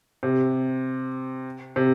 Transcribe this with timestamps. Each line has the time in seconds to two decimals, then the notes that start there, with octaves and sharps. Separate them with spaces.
0.23 C3
1.76 C3